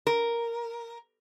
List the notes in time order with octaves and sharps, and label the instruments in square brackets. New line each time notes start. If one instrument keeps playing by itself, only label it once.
[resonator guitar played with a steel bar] A#4